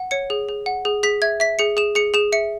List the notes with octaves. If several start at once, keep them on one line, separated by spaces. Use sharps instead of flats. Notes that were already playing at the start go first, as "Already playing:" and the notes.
Already playing: F#5
C#5 C#7
G#4
G#4
F#5
G#4
G#4 B6
E5 G#6
E5 B6
G#4 C#7
G#4 E7
G#4 C#7
G#4 E7
E5 C#7